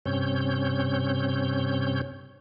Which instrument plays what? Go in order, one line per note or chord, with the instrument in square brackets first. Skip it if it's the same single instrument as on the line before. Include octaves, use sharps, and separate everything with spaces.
[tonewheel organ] G2 C3 C4 C#4 C#5 G6